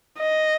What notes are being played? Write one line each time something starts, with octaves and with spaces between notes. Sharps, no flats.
D#5